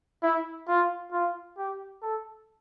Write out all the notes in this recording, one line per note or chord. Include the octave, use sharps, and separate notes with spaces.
E4
F4
F4
G4
A4